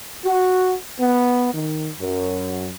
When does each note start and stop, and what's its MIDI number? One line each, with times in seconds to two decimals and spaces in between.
0.24 0.74 66
0.99 1.49 59
1.54 1.89 51
2.00 2.70 42